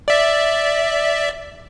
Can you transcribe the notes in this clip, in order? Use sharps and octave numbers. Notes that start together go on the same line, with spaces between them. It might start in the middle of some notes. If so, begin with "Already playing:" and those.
D5 E5